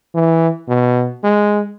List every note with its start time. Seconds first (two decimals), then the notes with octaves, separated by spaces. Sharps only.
0.15 E3
0.68 B2
1.23 G#3